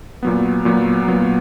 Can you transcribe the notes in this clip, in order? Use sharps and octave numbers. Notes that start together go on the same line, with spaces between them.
A#2 F#3 B3
A#2 F#3 B3
A#2 F#3 B3